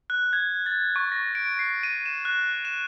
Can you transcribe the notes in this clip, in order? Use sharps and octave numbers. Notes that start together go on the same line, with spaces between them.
F#6
G#6
A6
C#6
A#6
D7
C7
D#7
E7
F#6
E7